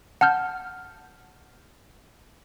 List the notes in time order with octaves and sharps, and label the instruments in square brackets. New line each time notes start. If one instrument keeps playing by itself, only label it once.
[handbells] F#5 A5 F6 G6